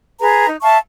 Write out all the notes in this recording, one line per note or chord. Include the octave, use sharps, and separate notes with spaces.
G#4 B4 A#5
D#4
E5 F5 A5 C#6